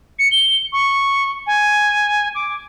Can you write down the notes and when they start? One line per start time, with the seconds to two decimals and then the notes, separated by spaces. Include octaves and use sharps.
0.19 C#7
0.31 G7
0.72 C#6
1.47 G#5
2.35 D6